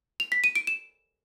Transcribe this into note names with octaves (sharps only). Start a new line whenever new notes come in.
F7
B6
D#7
D7
E7